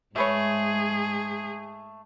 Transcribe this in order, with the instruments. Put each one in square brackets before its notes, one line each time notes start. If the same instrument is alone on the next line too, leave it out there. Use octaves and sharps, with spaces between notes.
[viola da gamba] G#2 G#3 [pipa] A3 B4 C#5 [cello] G#4